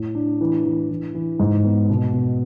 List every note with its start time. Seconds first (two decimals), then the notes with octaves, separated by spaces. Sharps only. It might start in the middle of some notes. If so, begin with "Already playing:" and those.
Already playing: A2
0.15 D4
0.41 E3
0.65 E3
0.90 E3
1.15 E3
1.40 G#2
1.64 B3
1.89 B2
2.13 B2